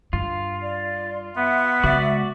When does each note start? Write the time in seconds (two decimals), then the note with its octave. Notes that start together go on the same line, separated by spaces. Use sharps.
0.13 G2 F4
0.61 D5
1.36 B3 E5 F#5
1.84 C#3 G#3 F#4 D5